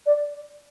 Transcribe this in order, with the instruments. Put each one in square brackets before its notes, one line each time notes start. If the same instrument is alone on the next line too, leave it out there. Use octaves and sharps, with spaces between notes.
[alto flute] D5